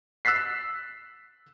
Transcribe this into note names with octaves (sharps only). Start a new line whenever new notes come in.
E6 F#6 A6 B6 C7